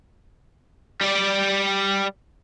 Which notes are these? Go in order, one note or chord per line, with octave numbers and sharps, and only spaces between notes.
G3 D5